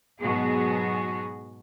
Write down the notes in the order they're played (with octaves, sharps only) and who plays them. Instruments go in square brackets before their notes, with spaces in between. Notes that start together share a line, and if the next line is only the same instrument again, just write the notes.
[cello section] G#2 B2 F#3 B3 F#4 G#4